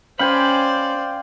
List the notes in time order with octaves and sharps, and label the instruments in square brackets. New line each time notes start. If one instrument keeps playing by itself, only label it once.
[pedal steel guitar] C#4 B5 [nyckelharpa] C5 D5 [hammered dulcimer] F5 G5 G#5